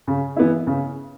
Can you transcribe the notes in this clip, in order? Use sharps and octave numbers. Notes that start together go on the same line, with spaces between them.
C#3
E3 B3 E4
C#3